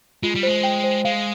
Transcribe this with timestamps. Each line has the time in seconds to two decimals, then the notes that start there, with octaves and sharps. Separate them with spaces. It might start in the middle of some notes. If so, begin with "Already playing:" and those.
0.23 G#3 F4
0.35 G3
0.43 G#3 C5
0.63 G5
0.84 C5
1.05 G#3 F5